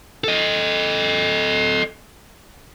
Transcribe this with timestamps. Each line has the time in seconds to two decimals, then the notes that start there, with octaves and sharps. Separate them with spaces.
0.24 A4 D#5